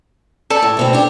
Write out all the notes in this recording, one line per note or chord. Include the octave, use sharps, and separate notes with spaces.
A4 D5
A2
D2 B2 C4
D4 G4